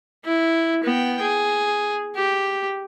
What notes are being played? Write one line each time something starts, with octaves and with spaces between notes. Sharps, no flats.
E4
B3 G5
G#4
G4